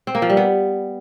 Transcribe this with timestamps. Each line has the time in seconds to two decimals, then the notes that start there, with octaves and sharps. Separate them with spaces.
0.07 C4
0.15 A#3
0.22 F3
0.30 G3
0.37 B3